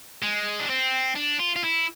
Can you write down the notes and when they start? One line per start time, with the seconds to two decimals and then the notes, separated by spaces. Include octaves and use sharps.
0.22 G#3
0.60 D4
0.70 C4
1.16 D4
1.39 F4
1.56 F4
1.64 E4